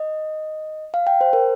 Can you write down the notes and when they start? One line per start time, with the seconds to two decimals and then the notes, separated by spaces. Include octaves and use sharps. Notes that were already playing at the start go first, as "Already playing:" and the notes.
Already playing: D#5
0.94 F5
1.07 G5
1.21 C5
1.33 A#4